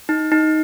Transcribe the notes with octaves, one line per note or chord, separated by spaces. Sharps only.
D#4
D#4